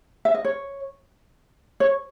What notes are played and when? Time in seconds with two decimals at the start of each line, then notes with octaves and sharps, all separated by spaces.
0.25 E5
0.34 D#5
0.45 C#5
1.80 C#5